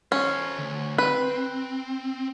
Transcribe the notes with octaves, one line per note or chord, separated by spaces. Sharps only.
C#4 A4 C5
D2
C4 B4